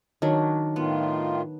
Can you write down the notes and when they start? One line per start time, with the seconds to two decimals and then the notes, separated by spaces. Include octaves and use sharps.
0.22 D#3 F#3 D4
0.76 A2 D#3 B3 F4